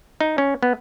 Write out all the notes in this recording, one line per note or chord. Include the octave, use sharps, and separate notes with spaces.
D#4
C#4
B3